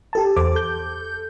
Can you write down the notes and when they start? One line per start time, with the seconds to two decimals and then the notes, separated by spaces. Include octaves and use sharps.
0.13 G4 A4 A5
0.36 E2 C5 D6
0.55 A4 G6